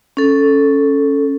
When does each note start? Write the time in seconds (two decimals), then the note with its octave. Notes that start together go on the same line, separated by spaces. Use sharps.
0.17 C#4 A4